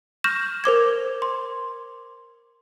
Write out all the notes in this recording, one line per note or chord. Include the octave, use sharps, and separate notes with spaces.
C#6 F6 G6 A#6 E7
A#4 C5 D6 G#6
C6